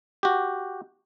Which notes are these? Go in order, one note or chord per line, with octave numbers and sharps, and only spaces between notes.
F#4 G4